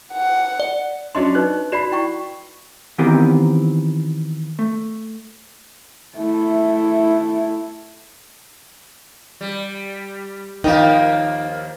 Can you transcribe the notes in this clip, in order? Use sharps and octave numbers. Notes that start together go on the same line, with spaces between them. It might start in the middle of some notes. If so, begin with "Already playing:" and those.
F#5
D5
F#3 C#4 D4 D#5 C6
D#4 B4 F#6
F#4 D5 B5 C7 E7
E4 G5 C#6
D#3 E3 B3 C4 G4 A#4
A3
A3 E4
G3
D#2 F3 A#3 D#4 A#4 F5 G5